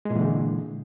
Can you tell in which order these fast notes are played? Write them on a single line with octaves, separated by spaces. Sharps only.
G#3 A#2 E3 D3